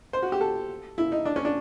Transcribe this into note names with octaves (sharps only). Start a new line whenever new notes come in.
C5
F#4
G4
A4
E4
D#4
D4
C#4
D4